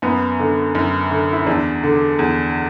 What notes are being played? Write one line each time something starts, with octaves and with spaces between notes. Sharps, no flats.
F#2 B3
D3
F#2
D3
E4
E2 D4
D3
E2